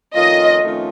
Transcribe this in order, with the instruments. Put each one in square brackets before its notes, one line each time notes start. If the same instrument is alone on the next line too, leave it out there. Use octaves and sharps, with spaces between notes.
[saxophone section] F2 D#3 A3 C#4 F4 [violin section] D#5
[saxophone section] F2 D#3 A3 C#4 F4